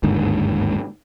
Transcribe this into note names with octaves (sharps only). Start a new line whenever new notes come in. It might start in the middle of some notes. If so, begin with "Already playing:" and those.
G1 D#2 G#2 D3